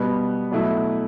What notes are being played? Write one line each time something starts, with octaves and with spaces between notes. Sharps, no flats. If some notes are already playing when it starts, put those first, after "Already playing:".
Already playing: B2 G3 B3
B2 F#3 A3 E4